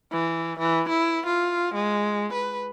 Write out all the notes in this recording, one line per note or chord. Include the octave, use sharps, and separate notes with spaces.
E3
E3
E4
F4
G#3
B4